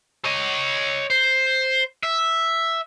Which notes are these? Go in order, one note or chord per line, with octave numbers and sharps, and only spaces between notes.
C#5 D#5
C5
E5